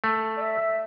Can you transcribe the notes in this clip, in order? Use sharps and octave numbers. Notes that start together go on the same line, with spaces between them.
A3
D5
E5
E5